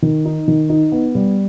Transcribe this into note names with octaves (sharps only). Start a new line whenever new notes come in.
D#3
D#4
D#3
D#4
B3
G3